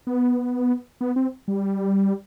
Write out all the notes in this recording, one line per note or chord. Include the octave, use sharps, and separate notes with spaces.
B3
B3
C4
G3